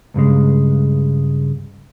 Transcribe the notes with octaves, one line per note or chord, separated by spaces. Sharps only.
C#2 G2 C#3 G#3